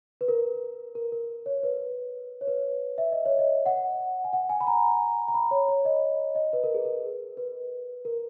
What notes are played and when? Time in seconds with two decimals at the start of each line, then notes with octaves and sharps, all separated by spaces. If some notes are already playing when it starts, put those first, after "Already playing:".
0.21 B4
0.28 A#4
0.95 A#4
1.12 A#4
1.46 C#5
1.63 B4
2.41 C#5
2.48 B4
2.98 E5
3.12 D#5
3.26 C#5
3.39 D#5
3.66 F#5
4.24 G#5
4.33 F#5
4.50 G#5
4.61 B5
4.67 A#5
5.28 A#5
5.34 B5
5.51 C#5
5.68 C#5
5.85 D#5
6.35 D#5
6.53 B4
6.64 A#4
6.74 G#4
6.85 A#4
7.37 B4
8.05 A#4